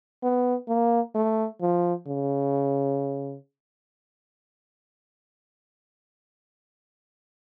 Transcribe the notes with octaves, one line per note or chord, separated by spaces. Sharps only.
B3
A#3
A3
F3
C#3